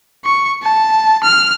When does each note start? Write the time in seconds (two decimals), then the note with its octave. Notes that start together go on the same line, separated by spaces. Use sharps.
0.25 C#6
0.63 A5
1.23 F6